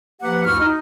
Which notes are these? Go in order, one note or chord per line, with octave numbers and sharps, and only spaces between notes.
F3 A#3 G4 B4 F#5
D2 G2 E4 F#4 C#6 F6
D#4